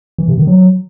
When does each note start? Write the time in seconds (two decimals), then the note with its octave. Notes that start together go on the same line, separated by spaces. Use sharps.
0.18 E3
0.28 C3
0.38 D#3
0.47 F#3